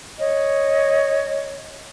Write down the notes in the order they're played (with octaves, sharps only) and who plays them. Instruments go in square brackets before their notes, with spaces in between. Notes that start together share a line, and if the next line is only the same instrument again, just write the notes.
[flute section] C#5 D#5